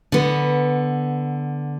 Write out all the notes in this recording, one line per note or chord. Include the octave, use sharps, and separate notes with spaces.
D3 B3